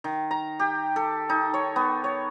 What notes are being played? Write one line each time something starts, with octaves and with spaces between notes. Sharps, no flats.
D#3
A#5
G4
A4
D#4
C#5
B3
C#5